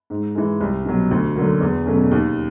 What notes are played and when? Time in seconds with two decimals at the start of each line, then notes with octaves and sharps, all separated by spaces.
0.10 G#2
0.35 E3 G#3
0.60 C2
0.85 B2 F#3
1.11 D2
1.36 D3 F#3 A#3
1.61 E2
1.86 B2 F#3 A3 C#4
2.11 D#2